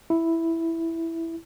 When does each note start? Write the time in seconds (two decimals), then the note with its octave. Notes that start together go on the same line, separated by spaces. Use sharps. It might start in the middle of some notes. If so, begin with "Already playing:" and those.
0.10 E4